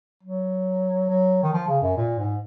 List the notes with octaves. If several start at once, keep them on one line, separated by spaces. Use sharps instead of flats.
F#3
F#3
D#3
F3
C#3
F#2
A#2
G#2